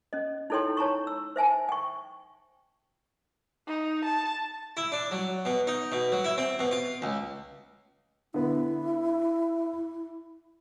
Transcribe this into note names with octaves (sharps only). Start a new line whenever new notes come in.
C#4 D#5
D#4 E4 A4 C#5 G5 C6
C#5 A5 A#5 C#6
E6
C5 E5 G#5 A5
G5 C#6
D#4
A5
E4
D4
F#3
B2
D#4
B2
F#3
E4
C4
B2
F4
C#2
D3 B3 E4